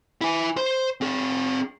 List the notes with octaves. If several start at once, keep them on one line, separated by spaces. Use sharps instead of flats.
E4 G#5
C5 C6
C4 G#4